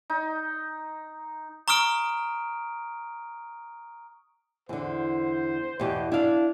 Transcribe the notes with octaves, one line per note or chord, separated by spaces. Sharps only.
D#4
A#5 C#6 D#6 F6 D7
E2 D3 C5
E2 B2 G4
D4 E4 F5